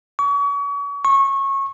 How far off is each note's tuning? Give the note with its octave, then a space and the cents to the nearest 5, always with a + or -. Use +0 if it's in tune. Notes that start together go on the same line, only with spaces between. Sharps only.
C#6 +40
C#6 -20